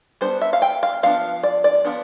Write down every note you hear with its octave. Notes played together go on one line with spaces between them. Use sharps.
G3 B3 D4 C5
E5
F5
G5
F5
F3 B3 D4 F5
D5
D5
F3 B3 D4